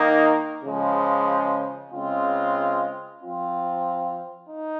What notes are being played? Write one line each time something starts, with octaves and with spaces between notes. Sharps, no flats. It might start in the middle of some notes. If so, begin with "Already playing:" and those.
Already playing: D#3 A#3 D#4
C#3 F3 G#3
C#3 G#3 C4 F4
F3 C4 F4
D#4